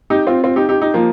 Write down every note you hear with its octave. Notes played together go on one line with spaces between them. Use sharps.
D#4 G4
C4 F4
C4 F4
D#4 G4
D#4 G4
D#4 G4
F3 A#3